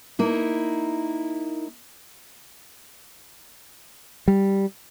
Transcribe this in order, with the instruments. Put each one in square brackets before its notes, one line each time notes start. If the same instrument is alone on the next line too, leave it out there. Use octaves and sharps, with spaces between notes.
[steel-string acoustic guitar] A#3 D#4 E4
[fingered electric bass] G3